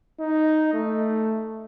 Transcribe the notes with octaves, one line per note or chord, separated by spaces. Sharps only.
D#4
A3